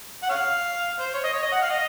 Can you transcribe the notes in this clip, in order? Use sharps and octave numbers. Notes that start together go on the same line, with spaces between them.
F#5
C#5 F5
C5
C#5
D#5
C#5
D#5
F#5
F5
D#5